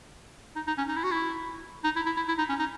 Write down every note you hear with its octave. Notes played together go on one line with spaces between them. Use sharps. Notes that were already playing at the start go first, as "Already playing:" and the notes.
D#4
D#4
C#4
D#4
E4
F#4
E4
D#4
E4
E4
E4
E4
D#4
C#4
D#4